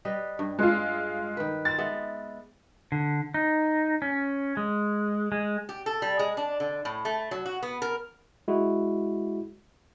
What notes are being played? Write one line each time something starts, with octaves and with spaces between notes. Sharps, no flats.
G3 B4 D#5
G2
G#3 F4
D#3 B4
C4 A6
G#3 B3 E5
D3
D#4
C#4
G#3
G#3
G4
A4
G3
G#3
D4
D3
A2
A3
F#3
F#4
B3
A#4
G#3 E4 F#4